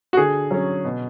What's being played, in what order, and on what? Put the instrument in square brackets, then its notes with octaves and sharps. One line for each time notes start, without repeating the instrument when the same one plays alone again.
[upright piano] F#4
D3 G#4
F#3 C#4
B2